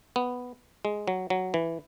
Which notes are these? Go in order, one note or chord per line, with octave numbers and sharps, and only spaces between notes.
B3
G#3
F#3
F#3
E3